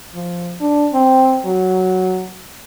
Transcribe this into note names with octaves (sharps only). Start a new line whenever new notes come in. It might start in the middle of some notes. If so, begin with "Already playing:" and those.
F3
D4
C4
F#3